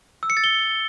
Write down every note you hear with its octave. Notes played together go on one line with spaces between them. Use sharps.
E6
C#7
A6
G7